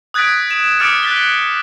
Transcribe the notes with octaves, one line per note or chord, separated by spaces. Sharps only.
D#6 F#6 G#6 A6 B6 D7
E7
D6 D#6 F6 A6 C#7 D7
F#6 A6 B6 G7